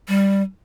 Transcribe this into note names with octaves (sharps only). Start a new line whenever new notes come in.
G3